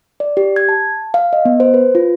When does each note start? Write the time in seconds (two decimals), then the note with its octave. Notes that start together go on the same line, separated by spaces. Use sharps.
0.20 D5
0.37 G4
0.56 G#6
0.69 A5
1.14 F5
1.33 D#5
1.45 B3
1.60 C5
1.74 B4
1.95 F4